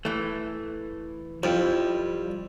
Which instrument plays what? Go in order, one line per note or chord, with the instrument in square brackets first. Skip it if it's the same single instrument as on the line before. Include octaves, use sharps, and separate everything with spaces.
[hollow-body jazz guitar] E3 A3
[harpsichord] F2 [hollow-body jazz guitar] F3 G3 E4